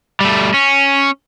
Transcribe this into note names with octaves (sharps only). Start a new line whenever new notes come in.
G3 A3
C#4